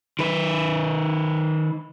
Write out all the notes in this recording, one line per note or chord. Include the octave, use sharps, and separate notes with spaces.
D#3 B4